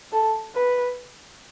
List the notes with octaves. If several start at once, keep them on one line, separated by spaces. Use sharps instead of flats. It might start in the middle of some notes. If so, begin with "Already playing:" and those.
A4
B4